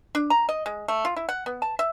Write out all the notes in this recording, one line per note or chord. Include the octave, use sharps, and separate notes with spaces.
D4
A#5
D#5
G#3
A3
F4
E4
F#5
B3
A5
E5